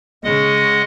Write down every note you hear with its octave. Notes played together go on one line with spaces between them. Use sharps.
C#3 G#3 D#5 F#5